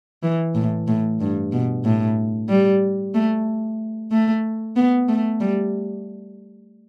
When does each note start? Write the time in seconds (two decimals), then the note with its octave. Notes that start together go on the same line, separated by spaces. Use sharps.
0.23 E3
0.55 A2
0.88 A2
1.20 G2
1.52 B2
1.85 A2
2.49 G3
3.15 A3
4.12 A3
4.76 B3
5.09 A3
5.41 G3